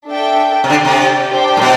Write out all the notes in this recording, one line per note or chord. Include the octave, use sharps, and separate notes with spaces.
D4 A4 E5 G5
C3
D3 G4 D5 G5
C3
D4 G4 C5 G5
A2
B2